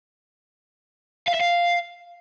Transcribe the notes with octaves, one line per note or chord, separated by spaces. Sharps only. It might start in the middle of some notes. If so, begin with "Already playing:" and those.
F5
E5
F5